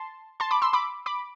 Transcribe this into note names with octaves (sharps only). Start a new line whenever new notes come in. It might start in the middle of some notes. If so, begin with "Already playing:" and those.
Already playing: A5 C6
A5 C6
B5 D6
C6 E6
B5 D6
B5 D6